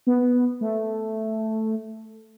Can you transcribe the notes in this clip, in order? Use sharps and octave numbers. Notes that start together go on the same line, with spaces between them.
B3
A3